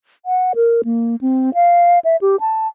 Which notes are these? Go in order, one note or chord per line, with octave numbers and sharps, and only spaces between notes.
F#5
A#4
A#3
C4
F5
E5
G4
A5